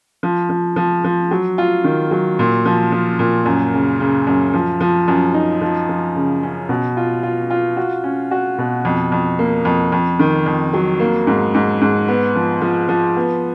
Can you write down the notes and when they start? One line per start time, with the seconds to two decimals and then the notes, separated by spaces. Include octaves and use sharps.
0.23 F3
0.49 F3
0.76 F3
1.04 F3
1.31 F#3
1.58 F4
1.84 D#3
2.11 F#3
2.39 A#2
2.65 F3
2.92 F3
3.19 A#2
3.46 F#2
3.74 C#3
4.00 C#3
4.27 F#2
4.54 F3
4.81 F3
5.08 F#2
5.34 D#4
5.61 F3
5.89 F3
6.16 C#3
6.43 C#4
6.69 B2
6.97 F4
7.23 F4
7.50 F4
7.77 F#4
8.04 C#4
8.31 F#4
8.58 B2
8.85 F2
9.12 F2
9.39 A#3
9.65 F2
9.92 F2
10.19 D#3
10.46 F2
10.73 F#3
11.00 A#3
11.27 G#2
11.54 G#2
11.81 G#2
12.08 B3
12.35 F3
12.61 F3
12.89 F3
13.16 B3